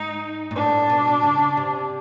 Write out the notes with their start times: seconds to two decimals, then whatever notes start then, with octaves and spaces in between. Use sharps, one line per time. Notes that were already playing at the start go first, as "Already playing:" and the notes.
Already playing: G#2 D#4
0.51 A#2
0.56 A2 D4
0.90 B2
1.23 C#3
1.57 C3